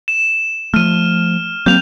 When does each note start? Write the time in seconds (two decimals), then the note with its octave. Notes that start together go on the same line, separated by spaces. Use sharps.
0.08 E7
0.74 F3 A3 F6 D#7
1.66 F#3 A#3 C4 G6 F7